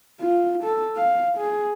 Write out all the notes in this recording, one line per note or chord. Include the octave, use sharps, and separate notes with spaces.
F4
A4
F5
G#4